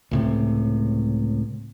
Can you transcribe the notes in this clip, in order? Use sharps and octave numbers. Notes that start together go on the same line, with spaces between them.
C#2 A2 C3